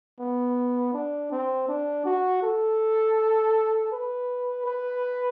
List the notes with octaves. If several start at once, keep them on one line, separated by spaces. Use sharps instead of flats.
B3
D4
C4
D4
F#4
A4
B4
B4